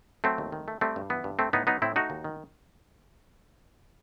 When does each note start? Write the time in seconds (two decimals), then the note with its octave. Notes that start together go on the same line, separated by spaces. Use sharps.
0.24 F#3 A3 C4
0.38 D#2
0.52 D#3
0.68 A3
0.81 G3 A3 C4
0.96 G2
1.10 E3 B3
1.24 G2
1.39 A3 C4
1.53 A2 B3 D#4
1.67 F#3 B3 D#4
1.82 A2 C4 E4
1.96 A3 D#4 F#4
2.10 D#2
2.24 D#3